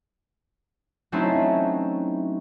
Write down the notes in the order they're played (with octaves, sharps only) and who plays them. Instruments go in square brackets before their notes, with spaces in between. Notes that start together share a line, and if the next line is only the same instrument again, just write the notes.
[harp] F#3 A3 C4 C#4 D#4 E4